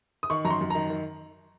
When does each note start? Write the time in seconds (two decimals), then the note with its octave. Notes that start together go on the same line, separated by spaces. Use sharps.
0.23 D#6
0.30 D#3 C#6
0.45 F#2 A#5
0.50 C6
0.61 F#2
0.70 D#3 A#5
0.90 D#3